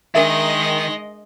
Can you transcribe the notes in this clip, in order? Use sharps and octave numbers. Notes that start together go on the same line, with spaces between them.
D#3 G#3 D4 A#4 D#5 E5